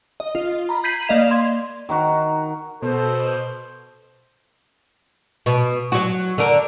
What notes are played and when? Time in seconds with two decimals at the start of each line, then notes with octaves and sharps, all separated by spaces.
0.20 D#5
0.35 F4
0.69 A#5 B5
0.84 G6 G#6 B6 C7 D#7 F#7
1.08 A#3 D5 D#5 F5 E7 F7
1.31 C6 G#6
1.89 D#3 D#4 F#4 A#4
2.82 B2 A4 C5
5.46 B2
5.92 F#3 F#4
6.38 D3 A#4